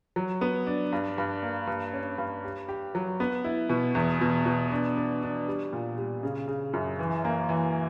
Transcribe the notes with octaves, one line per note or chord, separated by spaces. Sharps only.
F#3
B3
D4
G2
G2
A#3
G2
C#4
G2
G4
G4
F#3
B3
E4
B2
E2
B2
B2
D4
D4
D4
G3
A#2
G3
C#3
C#3
F#2
E3
A#3
E3